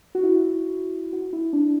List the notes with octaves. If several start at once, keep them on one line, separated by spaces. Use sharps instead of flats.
F#4
E4
F#4
E4
D4